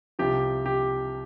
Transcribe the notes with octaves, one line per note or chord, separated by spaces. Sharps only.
C2 C3 F3 G4
G4